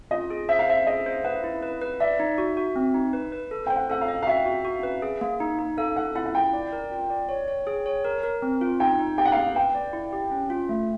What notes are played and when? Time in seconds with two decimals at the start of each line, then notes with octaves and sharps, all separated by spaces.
0.11 F4 D#5
0.30 G#4
0.49 C5 E5
0.59 F5
0.68 C5 E5
0.87 G#4 D#5
1.06 C5
1.24 B4 F#5
1.44 E4
1.63 B4
1.81 B4
2.00 D5 E5
2.20 D#4
2.38 F#4
2.57 F#4
2.76 C4
2.94 D#4
3.13 B4
3.32 B4
3.51 A4
3.66 C5 G5
3.76 F#5
3.90 A4 F#5
4.01 F5
4.08 D#5
4.23 F5
4.27 F#4 E5
4.46 F#4
4.65 F#4
4.83 B4
5.02 G#4
5.21 A#3
5.40 D#4
5.59 D#4
5.77 A4 F5
5.96 A4 F#5
6.15 E4 F#5
6.26 F#5
6.35 E4 G5
6.53 D5
6.73 A#4
6.92 F4
7.10 D5
7.29 C#5
7.48 C#5
7.67 G#4
7.86 C#5
8.04 A#4
8.23 A#4
8.42 C4
8.61 F4
8.80 D#4 G5
8.99 D#4
9.18 G4 G5
9.25 F#5
9.32 F5
9.37 A#3 F#5
9.55 B4 G5
9.75 D5
9.93 E4
10.13 G4
10.31 C#4
10.50 F4
10.69 A3